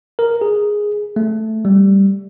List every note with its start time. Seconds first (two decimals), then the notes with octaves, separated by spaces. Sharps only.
0.19 A#4
0.41 G#4
1.16 A3
1.65 G3